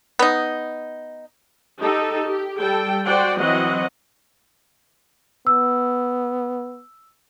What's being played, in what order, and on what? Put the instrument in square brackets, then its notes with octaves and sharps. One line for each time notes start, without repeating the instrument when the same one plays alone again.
[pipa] B3 D#4
[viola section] D#4 G4 A4
G4
G3 A4 G5
F#4 C5 D5 F#5 G5
E3 F#3 C4 D#5 F#5
[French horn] B3 [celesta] E6